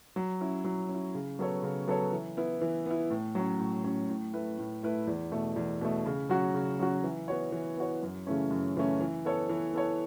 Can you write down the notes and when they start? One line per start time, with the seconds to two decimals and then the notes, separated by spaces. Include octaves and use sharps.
0.16 F#3
0.41 C#4 E4
0.65 F#3
0.89 C#4
0.94 E4
1.15 C#3
1.39 F#3 B3 A4 C#5
1.63 C#3
1.87 F#3 B3 A4 C#5
2.12 E3
2.37 B3 E4
2.61 E3
2.86 B3 E4
3.10 A2
3.35 F#3 C#4
3.59 A2
3.84 F#3 C#4
4.09 A2
4.33 A3 E4 B4
4.58 A2
4.83 A3 E4 B4
5.07 E2
5.32 B2 A3
5.56 E2
5.81 B2 A3
6.05 C#3
6.29 F#3 C#4 F#4
6.54 C#3
6.79 F#3 C#4 F#4
7.03 E3
7.28 B3 F#4 C#5
7.52 E3
7.77 B3 F#4 C#5
8.02 F#2
8.27 C#3 E3 A3 C#4
8.50 F#2
8.76 C#3 E3 A3 C#4
9.01 E3
9.25 B3 A4 C#5
9.49 E3
9.74 B3 A4 C#5